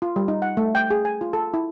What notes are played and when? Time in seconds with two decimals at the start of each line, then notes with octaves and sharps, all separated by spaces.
0.02 F4
0.16 G3
0.28 D#4
0.42 F#5
0.57 A3
0.75 G5
0.90 G#4
1.05 G#5
1.21 F4
1.33 A4
1.54 E4